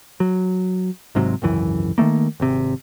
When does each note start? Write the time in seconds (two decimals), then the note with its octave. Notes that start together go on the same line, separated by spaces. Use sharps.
0.20 F#3
1.15 G#1 G#2 C3 F#3
1.42 G#1 C#2 F#2 E3
1.98 D#3 E3 A3 A#3
2.40 G#1 C3